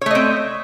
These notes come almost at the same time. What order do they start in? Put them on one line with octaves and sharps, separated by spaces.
C#5 A3 D#5 C4